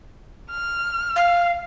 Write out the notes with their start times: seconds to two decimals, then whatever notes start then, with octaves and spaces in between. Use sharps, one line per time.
0.51 F6
1.16 F5